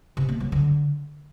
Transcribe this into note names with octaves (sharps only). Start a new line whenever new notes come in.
C3
A#3
F#3
D3